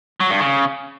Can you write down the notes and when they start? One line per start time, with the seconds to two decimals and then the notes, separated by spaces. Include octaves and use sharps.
0.20 F#3
0.30 G2
0.40 C#3